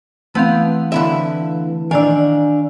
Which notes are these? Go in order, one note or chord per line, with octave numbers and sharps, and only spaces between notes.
E3 A3 B3 C4 F5
D3 E4 E5
D#3 D4 D5 F5 G#5 E6